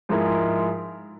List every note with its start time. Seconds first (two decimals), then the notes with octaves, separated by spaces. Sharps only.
0.09 G#2 F3 G#3 E4 A#4